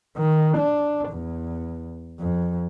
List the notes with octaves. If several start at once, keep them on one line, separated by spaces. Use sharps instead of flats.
D#3
D4
E2
F2